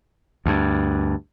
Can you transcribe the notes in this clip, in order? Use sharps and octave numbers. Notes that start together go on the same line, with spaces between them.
D2 G2